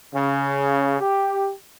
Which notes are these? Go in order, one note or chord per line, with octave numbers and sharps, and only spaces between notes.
C#3
G4